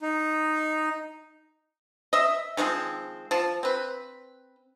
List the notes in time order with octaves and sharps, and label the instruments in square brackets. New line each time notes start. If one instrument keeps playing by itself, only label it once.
[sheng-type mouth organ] D#4
[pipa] D#5 E5
D#3 F3 G#3 C4
F3 A5
C4 B4